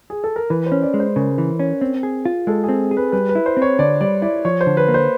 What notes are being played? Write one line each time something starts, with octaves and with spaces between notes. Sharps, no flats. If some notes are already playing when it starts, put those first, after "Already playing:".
G#4
A4
A#4
E3 B4
C5
C#4
D5
G#3
C5
C#3 A#4
E3
C#4
C4
G#4
F4
G#3 A4
C4 G#4
G#4
B4
G3 B4
B4
E4
C5
C4
C#5
D3 D5
G3 D5
E4 D5
F3 C#5
C5
D3
B4
A#3
C5